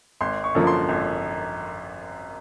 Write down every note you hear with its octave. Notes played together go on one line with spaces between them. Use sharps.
G#1 C6
C#6
F#2 D3 F3 A#3
C6
G#1